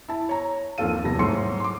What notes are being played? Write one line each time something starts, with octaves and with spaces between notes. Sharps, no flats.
E4 A5
C#5 A#5
D#2 F3 C4 A4 F5 D#7
D#1 C3 B3 A5 A#6
G#2 F#3 A3 C6 C#7
C6 D6